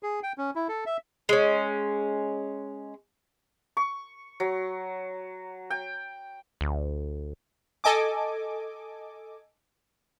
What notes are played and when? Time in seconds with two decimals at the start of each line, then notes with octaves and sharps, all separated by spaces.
0.03 G#4
0.23 G5
0.38 C#4
0.55 E4
0.68 A4
0.86 E5
1.29 G#3 C#4
3.77 C#6
4.40 F#3
5.70 G5
6.61 D2
7.84 A4 D#5 G#5 D6